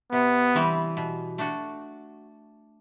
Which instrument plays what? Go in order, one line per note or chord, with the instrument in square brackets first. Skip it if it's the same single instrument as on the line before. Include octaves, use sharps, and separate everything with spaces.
[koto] C3 [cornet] B3
[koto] E3 G3 C4
B2
A3 D4 F#4